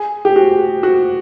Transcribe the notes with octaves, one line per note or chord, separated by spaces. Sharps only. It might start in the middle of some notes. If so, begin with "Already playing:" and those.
Already playing: G#4
G4
F#4
F#4